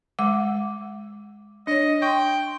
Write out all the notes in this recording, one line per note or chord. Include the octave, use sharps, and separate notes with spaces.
G#3 F#5 D6
D4 C#5 D#5
G5 C6 C#6